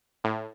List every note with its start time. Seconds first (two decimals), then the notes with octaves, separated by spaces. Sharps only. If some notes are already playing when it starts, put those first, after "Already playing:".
0.24 A2